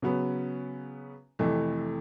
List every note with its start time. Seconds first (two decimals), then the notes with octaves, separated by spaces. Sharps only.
0.02 C#3 F#3 B3
1.39 F2 C3 E3 A3